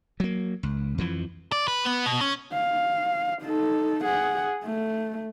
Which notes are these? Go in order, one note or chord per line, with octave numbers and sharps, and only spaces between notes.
F#3 A#3
C#2
F2 E3 F3
D5
B4
B3
B2
C#4
F5
D#4 A4
G#4 F#5
A3